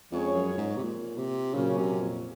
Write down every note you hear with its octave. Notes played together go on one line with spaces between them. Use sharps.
F2 F3 G#3 C#4 G#4 C#5
F#2
G#2
C3
A#2
C3
A#2 C#3 F#3 C#4
C3
F2